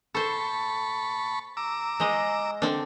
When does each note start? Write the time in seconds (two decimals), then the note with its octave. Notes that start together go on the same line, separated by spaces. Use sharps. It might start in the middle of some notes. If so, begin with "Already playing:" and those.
0.15 A4 C5 A5 B5 C#6
1.57 A#5 D6 E6
2.00 G#3 C5 D#5
2.62 D3 C4 D4